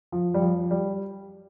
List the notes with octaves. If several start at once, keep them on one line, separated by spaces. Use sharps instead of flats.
F3
G3
F3
G3